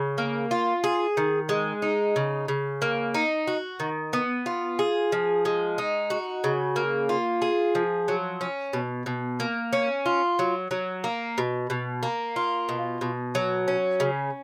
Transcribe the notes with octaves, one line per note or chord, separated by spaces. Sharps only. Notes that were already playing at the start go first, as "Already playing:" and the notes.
Already playing: C#3
A#3
F4
G#4
D#3
G#3
D#4
C#3
C#3
A#3
D#4
F#4
D#3
B3
F4
G#4
F3
G#3
D#4
F#4
C#3
A#3
F4
G#4
F3
F#3
C#4
B2
B2
A#3
C#4
F4
F#3
F#3
A#3
B2
B2
A#3
F4
B2
B2
F#3
C#4
C#3